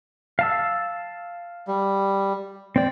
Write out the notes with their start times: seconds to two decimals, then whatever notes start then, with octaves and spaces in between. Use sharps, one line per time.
0.39 F5 A5 E6
1.67 G3
2.76 C4 D5 G5